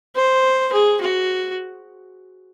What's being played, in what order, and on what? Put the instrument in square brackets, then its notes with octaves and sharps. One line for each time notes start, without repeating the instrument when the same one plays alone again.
[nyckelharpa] C5
G#4
F#4